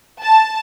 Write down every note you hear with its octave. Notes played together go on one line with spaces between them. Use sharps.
A5